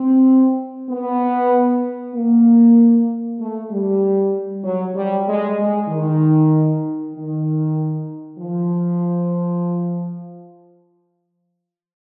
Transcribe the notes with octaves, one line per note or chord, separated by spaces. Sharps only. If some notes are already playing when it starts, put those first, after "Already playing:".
Already playing: C4
B3
A#3
A3
G3
F#3
G3
G#3
G#3
D#3
D#3
F3